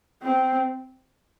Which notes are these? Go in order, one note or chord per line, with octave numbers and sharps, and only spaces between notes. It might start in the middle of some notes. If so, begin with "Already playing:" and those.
C4